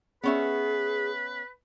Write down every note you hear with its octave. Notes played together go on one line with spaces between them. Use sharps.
B3 C#4 G#4 B4 E5